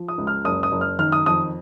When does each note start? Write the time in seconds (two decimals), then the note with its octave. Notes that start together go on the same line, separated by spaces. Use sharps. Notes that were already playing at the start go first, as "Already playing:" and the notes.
Already playing: F3
0.08 D#6
0.18 C#2
0.27 F6
0.45 F#1 D#6
0.63 D#6
0.72 F#1
0.81 F6
0.99 D#3 F6
1.12 D#6
1.26 F2 D#6